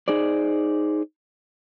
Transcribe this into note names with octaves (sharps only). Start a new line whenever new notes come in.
D#4 G#4 C5 D5